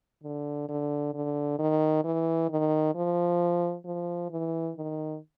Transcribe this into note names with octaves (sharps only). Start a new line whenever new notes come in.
D3
D3
D3
D#3
E3
D#3
F3
F3
E3
D#3